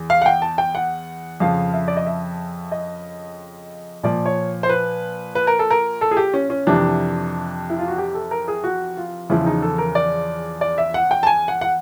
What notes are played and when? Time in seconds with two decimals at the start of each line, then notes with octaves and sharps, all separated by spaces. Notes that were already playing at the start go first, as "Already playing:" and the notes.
Already playing: E2
0.10 F5
0.22 F#5
0.26 G5
0.42 A5
0.58 G5
0.75 F#5
1.40 F2 C#3 F3 F5
1.73 E5
1.88 D5
1.97 D#5
2.07 E5
2.72 D#5
4.03 A#2 F3 D5
4.26 C#5
4.63 C5
4.69 B4
5.35 B4
5.47 A#4
5.59 A4
5.71 A#4
6.01 A4
6.11 G#4
6.17 G4
6.34 C#4
6.50 C#4
6.67 F2 C3 E3 D4
7.70 E4
7.79 F4
7.88 F#4
7.98 G4
8.15 A4
8.31 A#4
8.48 G#4
8.64 F#4
8.97 F4
9.30 E2 C#3 F3 E4
9.46 D#4
9.62 A4
9.78 A#4
9.95 D5
10.61 D5
10.78 E5
10.94 F#5
11.11 G5
11.23 A5
11.27 G#5
11.48 F#5
11.61 F#5